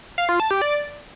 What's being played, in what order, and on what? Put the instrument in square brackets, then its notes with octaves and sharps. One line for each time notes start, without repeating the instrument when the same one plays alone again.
[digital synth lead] F5
F4
A5
G4
D5